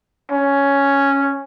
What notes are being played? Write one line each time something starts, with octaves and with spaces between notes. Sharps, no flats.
C#4